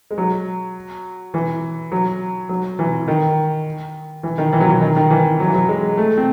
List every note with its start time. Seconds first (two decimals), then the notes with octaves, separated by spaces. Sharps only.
0.11 G#3
0.18 F#3
1.34 E3
1.92 F#3
2.49 F#3
2.79 E3
3.08 D#3
4.23 E3
4.38 D#3
4.53 E3
4.60 F#3
4.67 E3
4.81 D#3
4.96 D#3
5.10 E3
5.40 F#3
5.47 E3
5.54 F#3
5.69 G#3
5.97 A3
6.17 C4